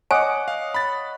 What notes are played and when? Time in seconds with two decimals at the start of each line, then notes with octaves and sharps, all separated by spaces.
0.11 C#5 D#5 F#5 G#5 D6 D7
0.48 F5
0.74 B5 A6